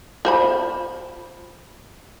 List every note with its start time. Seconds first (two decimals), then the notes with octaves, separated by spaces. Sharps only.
0.25 F4 C5 B5